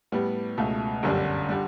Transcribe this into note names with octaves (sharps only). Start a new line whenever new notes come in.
A2 G3 B3
C#2 B2 A3
G1 F#2 D3 G3 D4
D3 G3